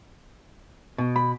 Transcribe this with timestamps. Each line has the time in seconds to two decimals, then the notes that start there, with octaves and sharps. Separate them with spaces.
0.98 B2
1.16 B5